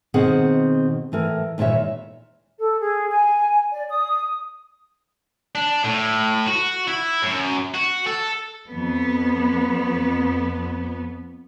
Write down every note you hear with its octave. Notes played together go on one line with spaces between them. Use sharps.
B2 D#3 C4 G#4 F#5
A2 E3 A#4
D#2 A#2 E3 C#5 E5
A4
G#4
G#5
D5
D#6
D4
A2
F#4
E4
F#2
F#4
A4
F2 B3